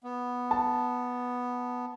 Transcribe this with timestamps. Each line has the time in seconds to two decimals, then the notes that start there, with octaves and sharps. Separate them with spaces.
0.04 B3
0.51 A5